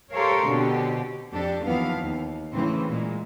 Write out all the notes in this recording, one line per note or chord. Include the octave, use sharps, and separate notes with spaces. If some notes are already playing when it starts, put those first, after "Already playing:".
G4 A4 A#4 C5 C#5 F5
B2 D3 C4 G4
F2 D4 G4 A4
D#2 E3 F3 B3 F5
D#2
A2 C#3 E3 C4
A#2 G#3